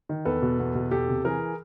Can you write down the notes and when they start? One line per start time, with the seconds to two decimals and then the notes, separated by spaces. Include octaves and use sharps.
0.09 D#3
0.25 E2 A4 B4
0.42 B2
0.59 E2
0.75 B2
0.91 E2 G4 A4
1.09 C3
1.25 E3 G#4 A#4